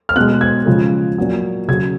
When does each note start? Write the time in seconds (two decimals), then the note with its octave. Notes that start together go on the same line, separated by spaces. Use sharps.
0.09 F6
0.16 B2 G#3 F#6
0.41 G#6
0.66 C#3 F3 G#3
1.18 A#2 F#3
1.68 C#3 F#3 G#6